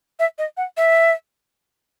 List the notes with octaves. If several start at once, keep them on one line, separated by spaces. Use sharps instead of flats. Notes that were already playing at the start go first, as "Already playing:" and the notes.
E5
D#5
F#5
E5